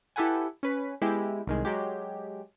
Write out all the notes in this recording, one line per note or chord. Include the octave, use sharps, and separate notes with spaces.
E4 G4 A4 B4 F#5 G#5
C#4 B4 B6
G#3 B3 E4 G4
C2 D#3 G#3
F#3 G#3 G4